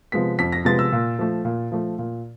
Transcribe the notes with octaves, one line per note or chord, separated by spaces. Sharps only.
C3 F3 G#3 B3 B6
F2 B6
A#6
C3 F3 G#3 B3 A6
E6
A#2
F3 A3
A#2
F3 A3
A#2